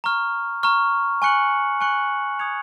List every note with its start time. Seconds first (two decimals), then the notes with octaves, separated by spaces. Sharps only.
0.04 A#5 C#6 F6
0.63 A#5 C#6 F6
1.22 G#5 C#6 F#6 C#7 F#7
1.81 G#5 C#6 F#6 C#7 F#7
2.39 D#6 G#6 C#7 F7